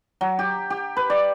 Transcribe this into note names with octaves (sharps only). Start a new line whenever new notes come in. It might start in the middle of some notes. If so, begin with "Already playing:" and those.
F#3
G4
G4
B4
D5